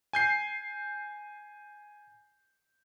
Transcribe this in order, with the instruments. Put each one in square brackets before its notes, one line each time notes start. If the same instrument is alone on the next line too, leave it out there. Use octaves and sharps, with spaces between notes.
[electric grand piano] G#5 G6 C7